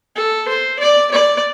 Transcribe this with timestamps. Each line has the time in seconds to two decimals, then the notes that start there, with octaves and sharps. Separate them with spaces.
0.16 A4
0.48 C5
0.79 D5
1.11 D5